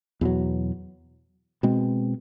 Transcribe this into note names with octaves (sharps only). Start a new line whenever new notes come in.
E2 B2 F#3
B2 G#3 C4